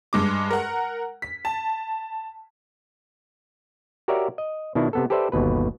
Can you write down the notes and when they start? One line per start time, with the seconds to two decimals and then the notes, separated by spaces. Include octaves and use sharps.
0.13 G2 G#3 D6
0.51 A#4 F#5
1.22 B6
1.45 A5
4.08 F#4 G4 A#4 C#5 D5 E5
4.38 D#5
4.75 B2 D#3 D4 E4
4.93 C3 B3 A4
5.10 G4 A4 B4 C5 D5 E5
5.32 G1 D#2 B2 B4